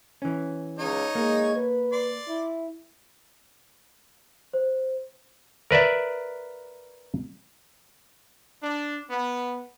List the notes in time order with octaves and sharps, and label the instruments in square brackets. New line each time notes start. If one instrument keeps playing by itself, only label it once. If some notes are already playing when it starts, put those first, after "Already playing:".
[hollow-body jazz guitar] E3 C#4
[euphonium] C#2 [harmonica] D#4 C#5
[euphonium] G#3 [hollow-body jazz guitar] A#3
[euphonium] B4
[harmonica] D5 C6
[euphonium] E4
[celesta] C5
[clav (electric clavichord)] A#4 B4 D5 E5
[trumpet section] D4
B3